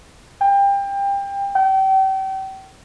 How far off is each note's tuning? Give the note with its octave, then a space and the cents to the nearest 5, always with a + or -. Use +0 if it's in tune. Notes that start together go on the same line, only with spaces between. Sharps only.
G5 +25
G5 -35